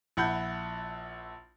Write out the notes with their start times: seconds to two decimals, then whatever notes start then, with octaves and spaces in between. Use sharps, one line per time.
0.17 A#1 E4 F#5 B5 G6